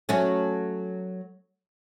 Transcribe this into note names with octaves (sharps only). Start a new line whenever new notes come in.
F#3 A3 C#4